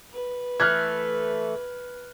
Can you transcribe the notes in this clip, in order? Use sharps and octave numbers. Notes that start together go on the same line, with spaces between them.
B4
E3 A3 F6 F#6 G#6